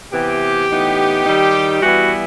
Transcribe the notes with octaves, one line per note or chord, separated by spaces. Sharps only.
C3 E3 B3 G4
A2 E3 B3 D#4
D#3 G3 D#4
E3 G3 B3 E4 F#4